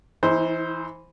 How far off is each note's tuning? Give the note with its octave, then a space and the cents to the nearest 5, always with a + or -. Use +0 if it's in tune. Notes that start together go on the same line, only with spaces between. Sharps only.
E3 +0 D#4 +45 C5 +0